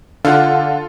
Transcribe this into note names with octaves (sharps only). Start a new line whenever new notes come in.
D3 F4 A4 F5 F#5